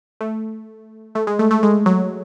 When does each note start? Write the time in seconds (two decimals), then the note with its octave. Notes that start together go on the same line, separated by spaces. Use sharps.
0.21 A3
1.15 A3
1.27 G#3
1.39 A3
1.51 A3
1.63 G#3
1.86 F#3